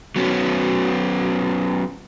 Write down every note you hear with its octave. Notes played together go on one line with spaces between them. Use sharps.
F#3 B3 C#4